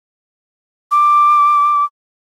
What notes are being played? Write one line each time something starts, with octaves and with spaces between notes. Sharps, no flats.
D6